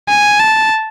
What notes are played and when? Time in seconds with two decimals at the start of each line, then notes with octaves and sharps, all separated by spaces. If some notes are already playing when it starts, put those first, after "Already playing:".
0.08 G#5
0.40 A5